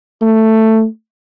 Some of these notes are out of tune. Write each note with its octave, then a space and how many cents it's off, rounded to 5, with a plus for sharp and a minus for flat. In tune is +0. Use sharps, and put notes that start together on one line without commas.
A3 +10